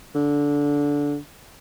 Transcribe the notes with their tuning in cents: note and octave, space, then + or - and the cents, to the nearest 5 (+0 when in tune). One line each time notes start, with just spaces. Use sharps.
D3 -15